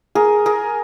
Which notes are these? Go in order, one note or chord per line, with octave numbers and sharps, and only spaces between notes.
G#4 A#4
G#4 A#4